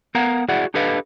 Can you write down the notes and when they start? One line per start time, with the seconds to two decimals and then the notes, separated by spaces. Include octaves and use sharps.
0.15 B3 A#4 F5 F#5 A#5
0.48 E4 F#4 G#4 D5 F#5
0.74 D4 G4 A4 B4 D#5 F5